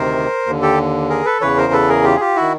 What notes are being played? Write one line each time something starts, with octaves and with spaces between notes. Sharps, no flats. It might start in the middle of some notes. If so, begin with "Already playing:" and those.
Already playing: D2 C3 D#3 A#4 C5
D#2 D3
G4 A4
G#4 A#4
A4 B4
E2 C#3 E3 B4 C#5
A#4 C5
A4 B4
G#4 A#4
F4 G4
G#4
F4 G4
D#3 E4 F#4